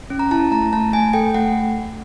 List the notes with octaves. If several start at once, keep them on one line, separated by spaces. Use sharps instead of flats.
C#4
A#5
E4 A5
A3 A#5
A3 A5
A3 G#5
A4 G5
A3 F#5